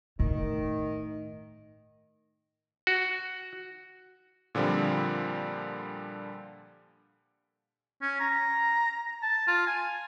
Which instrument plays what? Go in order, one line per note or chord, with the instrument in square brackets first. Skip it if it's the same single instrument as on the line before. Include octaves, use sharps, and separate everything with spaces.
[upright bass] A2 [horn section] D#3
[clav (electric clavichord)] F#4
[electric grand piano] A#2 D3 F3 G3 C4
[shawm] C#4
A#5
A5
F4
G#5